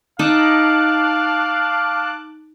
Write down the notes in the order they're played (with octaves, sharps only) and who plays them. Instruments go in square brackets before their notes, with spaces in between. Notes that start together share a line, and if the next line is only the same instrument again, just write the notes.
[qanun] D#4 [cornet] F5 [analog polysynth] A5 D6 F#6